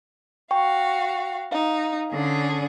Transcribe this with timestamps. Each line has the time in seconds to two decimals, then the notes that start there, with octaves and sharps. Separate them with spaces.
0.51 F#4 F5 G5 C#6
1.52 D#4 F5
2.12 D3 C#4 G#4